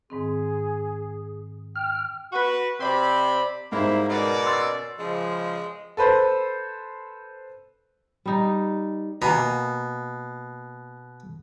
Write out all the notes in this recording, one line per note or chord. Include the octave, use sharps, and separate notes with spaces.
G#2 D#3 C4 G#4
G5 F6
F#4 B4
C3 C4 D5 B5
G#2 G3 A#3 E4 C5
B2 C#4 A#4 D5
C6 E6 A6
C#3 F3 G#3
A4 B4 C5
G3 D#4
B2 A#3 G#5 A#5